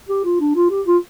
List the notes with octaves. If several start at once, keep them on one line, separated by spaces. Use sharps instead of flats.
G4
F4
D4
F4
G4
F4